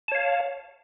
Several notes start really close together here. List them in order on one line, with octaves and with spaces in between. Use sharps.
A5 C#5 F5